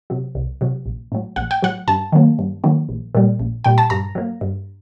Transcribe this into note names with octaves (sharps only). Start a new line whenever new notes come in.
C3 F#3
C2
C3 F#3
A#1
A2 F#3
A#1 F#5
G5
A2 F#3 F#5
G2 A5
D#3 F#3 A#3
G2
D#3 F#3 A#3
A#1
A#2 G3
A#1
A#2 G3 G5
A5
G2 A#5
F#3 A#3
G2